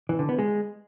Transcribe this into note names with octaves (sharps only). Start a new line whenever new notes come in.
E3
D3
B3
G#3